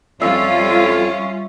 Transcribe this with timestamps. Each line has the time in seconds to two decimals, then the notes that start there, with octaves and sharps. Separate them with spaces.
0.21 F2 G3 C#4 F4 E5